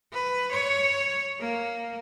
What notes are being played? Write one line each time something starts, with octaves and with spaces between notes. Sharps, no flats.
B4
C#5
A#3